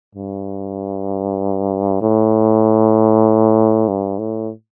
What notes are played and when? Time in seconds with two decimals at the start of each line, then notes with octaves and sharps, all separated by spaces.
0.15 G2
2.01 A2
3.88 G2
4.19 A2